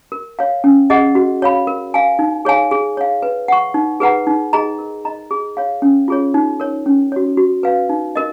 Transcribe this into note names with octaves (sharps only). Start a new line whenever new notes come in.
A#4
C#5 F5
C#4
G#4 D#5 F#5
F#4
C#5 F5 B5
A#4
F5 G#5
D#4
G#4 C#5 F5 G#5
G#4
C#5 F5
B4
F#5 C#6
D#4
G#4 B4 F#5 A#5
D#4
G#4 D#5 A#5
A#4
D#5 A#5
G#4
C#5 F5
C#4
F4 G#4 C#5
D#4
A#4 C#5
C#4
F#4 C#5
F#4
B4 F5
D#4
A#4 D#5